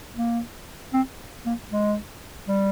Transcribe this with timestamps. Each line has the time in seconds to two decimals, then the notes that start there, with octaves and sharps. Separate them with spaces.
0.17 A#3
0.93 C4
1.46 A#3
1.72 G#3
2.48 G3